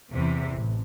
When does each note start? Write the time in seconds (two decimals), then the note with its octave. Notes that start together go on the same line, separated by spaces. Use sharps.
0.11 E2 C3 E3
0.54 A1